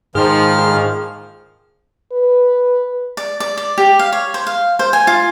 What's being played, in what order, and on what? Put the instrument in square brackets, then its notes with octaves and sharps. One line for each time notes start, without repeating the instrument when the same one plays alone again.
[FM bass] G#2 [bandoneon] D#3 F6 [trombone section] F3 [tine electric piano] G#4
[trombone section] A#1 F3 [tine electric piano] G#4
[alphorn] B4
[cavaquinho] D5
D5
D5
G4
F5
C#5
C5
F5
C5
G#5
F4